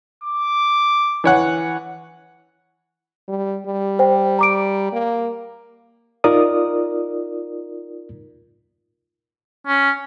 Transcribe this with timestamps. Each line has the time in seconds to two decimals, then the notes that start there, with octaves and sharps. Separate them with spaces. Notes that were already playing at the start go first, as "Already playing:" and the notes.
0.24 D6
1.24 E3 C#5 F#5
3.29 G3
3.66 G3
3.99 C5 G5
4.39 A#5 D6 D7
4.93 A#3
6.24 D#4 F4 A#4 D5 D#6
9.67 C#4